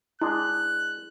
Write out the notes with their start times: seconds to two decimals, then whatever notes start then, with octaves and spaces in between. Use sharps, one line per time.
0.21 G#3 D4 E4 F#6